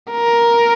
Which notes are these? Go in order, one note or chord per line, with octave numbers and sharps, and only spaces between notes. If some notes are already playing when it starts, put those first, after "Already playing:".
A#4